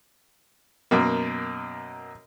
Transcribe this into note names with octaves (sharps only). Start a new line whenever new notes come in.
F#2 B2 A#3